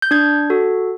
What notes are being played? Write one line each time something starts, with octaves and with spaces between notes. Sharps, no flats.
G6
D4 G#6
F#4 A4